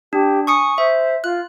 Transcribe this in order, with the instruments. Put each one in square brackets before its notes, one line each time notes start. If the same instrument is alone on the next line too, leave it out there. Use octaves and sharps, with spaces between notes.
[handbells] D4 [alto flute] G4
[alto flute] G#5 [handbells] C#6 D#6 C#7
[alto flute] C5 [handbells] E5
[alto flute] F4 [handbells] F#6